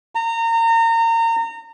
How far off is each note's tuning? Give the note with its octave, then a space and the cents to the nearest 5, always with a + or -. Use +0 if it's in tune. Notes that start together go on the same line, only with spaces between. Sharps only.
A#5 -30